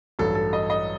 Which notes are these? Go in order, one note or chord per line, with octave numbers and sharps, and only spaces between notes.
A1 G2 F#3 A4
A4
D#5
D#5